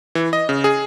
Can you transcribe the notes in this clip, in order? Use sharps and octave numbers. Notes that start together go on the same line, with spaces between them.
E3
D#5
C#3
G#4